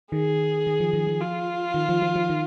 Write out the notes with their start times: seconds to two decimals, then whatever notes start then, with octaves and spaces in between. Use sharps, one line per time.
0.12 D#3 G#4
0.67 D#3
0.80 F3
0.93 D#3
1.07 F3
1.21 F4
1.74 D#3
1.89 F3
2.02 F3
2.16 F3
2.30 D#3